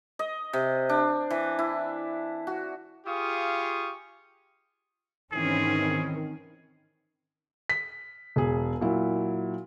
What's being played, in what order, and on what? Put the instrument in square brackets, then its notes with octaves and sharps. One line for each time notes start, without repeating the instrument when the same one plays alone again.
[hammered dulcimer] D#5
C3
D4
E3
E4
F#4
[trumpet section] F4 G4 G#4 F5 C#6 D#6
[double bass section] G#2 D#3 [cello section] E3 C4 C#4 [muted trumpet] G#4
[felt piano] B6
E1 G#4
A#2 F#3 E4